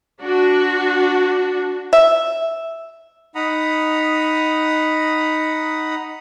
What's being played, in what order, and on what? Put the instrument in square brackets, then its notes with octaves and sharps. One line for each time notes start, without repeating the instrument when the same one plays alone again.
[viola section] D4 F#4
[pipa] E5
[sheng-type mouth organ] D#4 F#5 A#5 B5 D#6